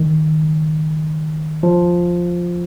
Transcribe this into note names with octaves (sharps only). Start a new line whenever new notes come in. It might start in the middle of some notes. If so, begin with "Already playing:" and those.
Already playing: D#3
F3